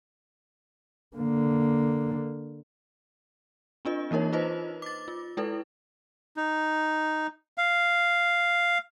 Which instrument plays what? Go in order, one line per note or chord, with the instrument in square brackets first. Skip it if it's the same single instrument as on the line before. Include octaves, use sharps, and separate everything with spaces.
[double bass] D3 A#3
[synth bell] C4 D4 F4 D#5
E3 A#3 D#4 A#4 C#5
D#4 F4 B4 C5 D#5
D6 A6
F4
G#3 E4 A4 B4
[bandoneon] D#4
F5